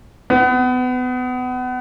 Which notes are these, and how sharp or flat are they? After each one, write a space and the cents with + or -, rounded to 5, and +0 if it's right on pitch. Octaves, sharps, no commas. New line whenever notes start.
B3 +30